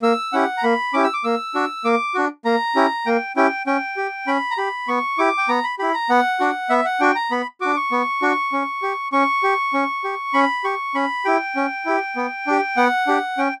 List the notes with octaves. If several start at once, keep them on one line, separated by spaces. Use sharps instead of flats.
A#3 E6
C#4 E4 G4 F#5
A#5
A#3 B5
C#4 E4 G4 D6
E6
D6
A#3 E6
D4 F#4
A#3 D6
D4 F#4
A#3 A#5
C#4 E4 G4
A#3 G5
C#4 E4 G4 G5
C#4 G5
G4
C#4 B5
A#5
G4 B5
B3 C#6
E4 G4 D6
G5
B3 A#5
B5
E4 G4 B5
A#5
B3 F#5
D4 F#4
B3 E5
F#5
D4 F#4 G5
A#5
B3 B5
D4 F#4 D6
C#6
B3
D4 F#4
C#4
G4
C#4 C#6
G4
C#4
G4
C#4 B5
G4 C#6
C#4 B5
E4 G4 G5
C#4
E4 G4
B3
D4 G4
B3 F#5
D4 G4
C#4 G5